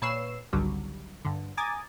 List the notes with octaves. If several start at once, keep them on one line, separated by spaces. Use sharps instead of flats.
A#2 B4 C#5 E6 C7 E7
G#1 C#2 D3 F#3 G3
G2 D3
G#5 A#5 D6 D#6 G#6 A6